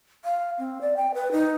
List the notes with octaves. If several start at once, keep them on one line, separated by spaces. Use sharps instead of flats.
F5
C4
D5
G5
B4
D#4